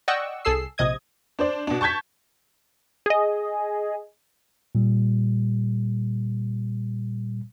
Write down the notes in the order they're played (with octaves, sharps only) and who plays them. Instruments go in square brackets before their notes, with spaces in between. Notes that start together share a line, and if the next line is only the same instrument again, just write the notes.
[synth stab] D5 D#5 F#5 G5 C#6 E6
C2 G#4 A4 E6 C7
A#1 C3 D#5 D#6 G#6
[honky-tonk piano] D4 C5 D5
B2 D4
A5 C#6 G6 G#6 B6
[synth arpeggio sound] G#4 D#5
[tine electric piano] A#2 G3